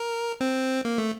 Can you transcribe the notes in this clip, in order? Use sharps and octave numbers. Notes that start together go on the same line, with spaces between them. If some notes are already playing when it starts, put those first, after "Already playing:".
Already playing: A#4
C4
A#3
A3